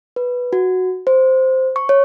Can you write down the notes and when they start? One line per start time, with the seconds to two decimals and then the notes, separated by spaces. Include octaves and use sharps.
0.16 B4
0.53 F#4
1.07 C5
1.76 C#6
1.89 C#5